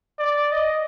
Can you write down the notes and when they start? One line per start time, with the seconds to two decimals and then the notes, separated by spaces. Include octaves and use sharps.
0.19 D5
0.52 D#5